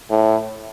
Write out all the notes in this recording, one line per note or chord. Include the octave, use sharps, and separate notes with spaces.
A2